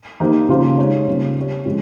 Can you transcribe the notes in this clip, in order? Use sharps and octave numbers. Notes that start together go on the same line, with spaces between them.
D#3 A#3 D#4 G4 C5
C#3 F3 A#3 F4 C5
G#3 D#4 G4 C#5
C#3 G3 A#3 F4 C5
C4 G4 C#5
C#3 F3 G#3